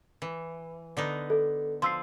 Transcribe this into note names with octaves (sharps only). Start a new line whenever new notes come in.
E3
D3 B3 D#4
A4
F3 C6 E6 C7